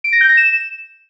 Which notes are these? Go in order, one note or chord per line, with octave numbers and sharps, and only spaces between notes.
D7
A#6
G6
A#6
E7